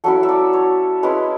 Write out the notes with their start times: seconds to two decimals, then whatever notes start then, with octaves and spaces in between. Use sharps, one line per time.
0.04 F#3 C#4 E4 A4
0.23 E5
0.29 D5
0.53 C#5
1.03 G#3 C#4 E4 B4